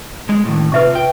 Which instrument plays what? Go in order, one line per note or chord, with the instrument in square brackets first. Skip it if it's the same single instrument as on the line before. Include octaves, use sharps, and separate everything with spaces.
[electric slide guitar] G#3
A2 D#3
[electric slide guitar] C3 F4 [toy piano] B4 E5 C#6
[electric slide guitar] G5